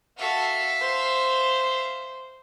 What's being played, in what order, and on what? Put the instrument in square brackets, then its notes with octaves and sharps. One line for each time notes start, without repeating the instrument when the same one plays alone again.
[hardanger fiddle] F#4 A4 [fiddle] E5 F5
[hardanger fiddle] C5